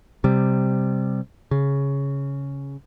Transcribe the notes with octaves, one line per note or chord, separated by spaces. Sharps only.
C3 G3
C#3